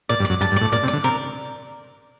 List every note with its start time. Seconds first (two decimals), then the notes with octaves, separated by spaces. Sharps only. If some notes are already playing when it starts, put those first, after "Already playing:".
0.09 A#2 D5
0.20 G2
0.25 D5
0.30 F#2
0.41 G2 A5
0.52 G2
0.56 A2 D5
0.72 A#2 D5
0.83 C3
0.88 D5
0.93 D3
1.04 C3 A#4